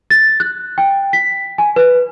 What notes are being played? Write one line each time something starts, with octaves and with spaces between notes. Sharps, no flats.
A6
F#6
G5
B6
G#5
B4